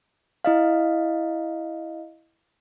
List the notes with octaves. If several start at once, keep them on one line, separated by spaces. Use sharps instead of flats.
E4 D#5 F5